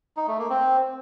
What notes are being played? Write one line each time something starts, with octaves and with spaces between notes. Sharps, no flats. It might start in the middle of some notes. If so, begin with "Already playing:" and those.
D#4
A3
A#3
C4